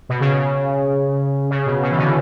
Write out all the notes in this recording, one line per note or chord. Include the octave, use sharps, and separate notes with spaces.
B2
C#3
C#3
B2
C#3
E3
B2 D3